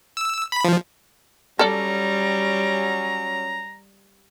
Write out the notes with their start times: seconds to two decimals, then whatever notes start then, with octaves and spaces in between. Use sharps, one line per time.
0.17 E6
0.52 B5
0.64 F3
1.59 F#3 G3 C#4 A4 D5 A#5